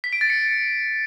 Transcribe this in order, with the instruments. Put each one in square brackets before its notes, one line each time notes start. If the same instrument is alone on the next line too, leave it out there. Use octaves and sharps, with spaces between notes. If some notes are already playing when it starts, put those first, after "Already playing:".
[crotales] B6
D7
A6
C#7